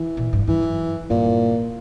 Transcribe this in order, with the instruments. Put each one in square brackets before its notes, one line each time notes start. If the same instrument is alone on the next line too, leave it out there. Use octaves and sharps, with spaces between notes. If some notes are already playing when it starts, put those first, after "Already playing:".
Already playing: [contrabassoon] E3
[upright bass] A#2
G2
[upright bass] G2 [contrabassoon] E3
[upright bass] F#2
[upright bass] G2 [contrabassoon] A#2